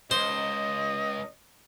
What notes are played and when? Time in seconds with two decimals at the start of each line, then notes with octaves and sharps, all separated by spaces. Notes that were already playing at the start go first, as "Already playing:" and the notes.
0.11 C#2 C5 D#5